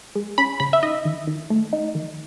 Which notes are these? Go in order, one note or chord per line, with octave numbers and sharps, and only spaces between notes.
G#3
C#4 B5
C#3 B5
E5
D#4 D#5
D#3
D#3
A3
D#4
D#3